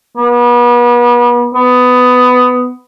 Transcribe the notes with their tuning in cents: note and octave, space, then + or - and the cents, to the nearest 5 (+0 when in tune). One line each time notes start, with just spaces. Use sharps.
B3 -35
B3 +15